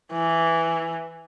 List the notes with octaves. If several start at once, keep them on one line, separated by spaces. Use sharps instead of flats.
E3